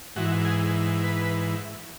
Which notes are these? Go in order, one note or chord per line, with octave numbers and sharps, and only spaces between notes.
G#2 E3 F#4
G#4
B4